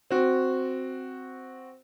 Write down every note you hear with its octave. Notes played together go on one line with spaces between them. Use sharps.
C4 F#4